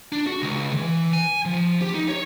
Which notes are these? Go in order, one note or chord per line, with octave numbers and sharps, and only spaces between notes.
D4
F#4
C#2
E3
G#5
F3
G4
D#4
C#5